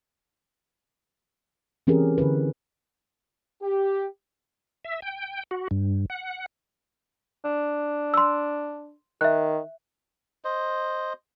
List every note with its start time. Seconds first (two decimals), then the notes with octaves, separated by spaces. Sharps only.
1.87 E3 C4 C#4 G4 G#4 A#4
2.18 D3 E4 B4
3.62 G4
4.84 E5
5.02 G5
5.51 F#4
5.71 G2
6.10 F#5
7.44 D4
8.14 C6 E6
9.21 D#3 E5 F#6
10.44 C5 D#5